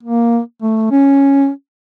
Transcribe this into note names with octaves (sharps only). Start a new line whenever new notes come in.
A#3
A3
C#4